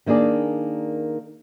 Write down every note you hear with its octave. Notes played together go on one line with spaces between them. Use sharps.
D#3 A#3 D4 G#4 D5